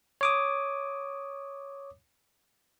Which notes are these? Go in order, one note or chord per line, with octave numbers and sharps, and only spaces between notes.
C#5 D6 D#6